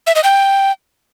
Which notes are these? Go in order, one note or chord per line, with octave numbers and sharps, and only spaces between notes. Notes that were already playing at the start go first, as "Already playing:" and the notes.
E5
D#5
G5